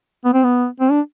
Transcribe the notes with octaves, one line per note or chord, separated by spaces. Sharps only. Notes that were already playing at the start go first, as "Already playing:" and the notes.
B3
C4
B3
C4
D4